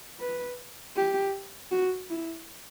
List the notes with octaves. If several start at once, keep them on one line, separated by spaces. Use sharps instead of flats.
B4
G4
F#4
E4